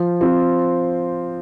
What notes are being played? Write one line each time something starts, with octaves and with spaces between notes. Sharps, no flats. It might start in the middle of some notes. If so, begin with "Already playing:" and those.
Already playing: F3
C4 F4